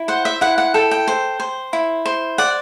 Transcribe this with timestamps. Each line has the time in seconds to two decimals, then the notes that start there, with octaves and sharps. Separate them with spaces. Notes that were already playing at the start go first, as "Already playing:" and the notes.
Already playing: E4
0.08 C5 F#5
0.25 E5
0.41 E4 F#5
0.58 F#5
0.74 A4 G5
0.91 G5
1.08 C5
1.40 C5
1.73 E4
2.06 C5
2.38 D5 F#5